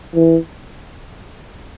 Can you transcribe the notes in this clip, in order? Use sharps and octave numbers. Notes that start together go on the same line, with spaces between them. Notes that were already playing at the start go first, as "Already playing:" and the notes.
E3